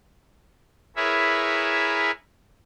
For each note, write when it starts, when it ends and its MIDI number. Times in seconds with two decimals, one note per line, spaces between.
0.96 2.11 64
0.96 2.11 68
0.96 2.11 70
0.96 2.11 71
0.96 2.11 73
0.96 2.11 76